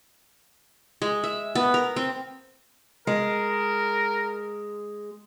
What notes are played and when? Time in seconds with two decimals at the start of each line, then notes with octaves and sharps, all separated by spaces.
1.02 G#3
1.24 E5
1.55 B3
1.74 A#4
1.96 C4
3.07 G#3 A#4